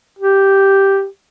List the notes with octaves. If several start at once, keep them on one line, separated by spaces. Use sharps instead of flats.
G4